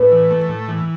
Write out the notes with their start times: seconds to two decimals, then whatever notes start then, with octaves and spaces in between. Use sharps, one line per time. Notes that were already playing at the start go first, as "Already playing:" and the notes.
Already playing: A2 B4
0.12 E3
0.31 A3
0.49 A2
0.68 E3